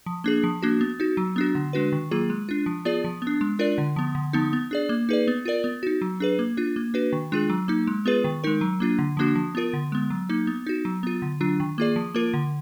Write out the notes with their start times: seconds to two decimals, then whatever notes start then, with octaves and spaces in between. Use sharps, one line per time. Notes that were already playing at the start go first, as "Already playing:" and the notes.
0.06 F3
0.24 A#3 D4 G#4
0.44 F3
0.62 A#3 D4 F#4
0.81 B3
1.00 D#4 F#4
1.17 F#3
1.36 B3 D4 F#4
1.55 D3
1.73 G#3 D4 F#4 B4
1.92 D#3
2.11 F#3 A#3 F4 G#4
2.30 G#3
2.49 D4 F4
2.66 F3
2.85 B3 F4 G#4 D5
3.04 F3
3.22 B3
3.27 D4
3.41 G#3
3.59 D4 F4 A#4 D5
3.78 D3
3.96 F3 B3
4.15 D3
4.33 F3 B3 D#4
4.53 B3
4.71 D4 G#4 D5
4.89 A#3
5.09 D#4 G#4 B4 D5
5.28 B3
5.45 F4 A#4 D5
5.64 B3
5.83 D#4 F#4
6.02 F#3
6.20 D4 G#4 B4
6.39 A#3
6.57 D4 F4
6.76 A#3
6.94 D4 F#4 B4
7.13 D#3
7.32 G#3 D4 F4 G#4
7.50 F#3
7.68 A#3 D#4
7.87 G#3
8.06 B3 F4 G#4 B4
8.24 D#3
8.44 G#3 D#4 A#4
8.61 F#3
8.80 A#3 D4 F4
8.99 D3
9.17 F3 A#3 D4 F#4
9.36 F3
9.55 B3 F4 A#4
9.73 D3
9.92 G#3 B3
10.10 F#3
10.29 A#3 D#4
10.47 B3
10.67 D#4 F#4
10.85 F#3
11.03 B3 F4
11.22 D3
11.41 F#3 D4 F4
11.60 D#3
11.78 A#3 F4 G#4 D5
11.96 F3
12.15 A#3 F4 A#4
12.34 D3